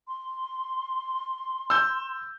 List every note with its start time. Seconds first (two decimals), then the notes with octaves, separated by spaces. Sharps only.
0.08 C6
1.70 E6 G6